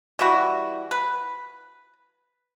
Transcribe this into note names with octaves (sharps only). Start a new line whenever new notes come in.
E3 G3 E4 F#4
B4